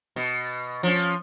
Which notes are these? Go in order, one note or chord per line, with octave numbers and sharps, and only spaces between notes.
B2
F3 C#4